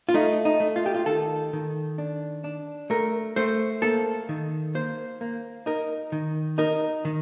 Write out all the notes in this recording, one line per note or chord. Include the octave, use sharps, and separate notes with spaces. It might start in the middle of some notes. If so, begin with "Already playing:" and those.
F4
A3 D#4
D#4
A3
F4
G4
F4
D#3 A4
D#3
D4
D4
A3 A#4
A3 C5
A#3 A4
D#3
A#3 C5
A#3
D#4 A#4
D#3
D#4 A#4
D#3